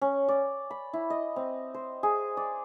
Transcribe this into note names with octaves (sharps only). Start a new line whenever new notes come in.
C#4
D5
B5
E4
D#5
C4
C5
G#4
D5